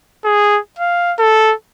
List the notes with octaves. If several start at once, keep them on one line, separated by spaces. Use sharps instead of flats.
G#4
F5
A4